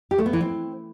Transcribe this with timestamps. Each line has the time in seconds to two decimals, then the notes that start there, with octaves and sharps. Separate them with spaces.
0.11 G4
0.18 A3
0.26 B3
0.33 E3
0.41 C4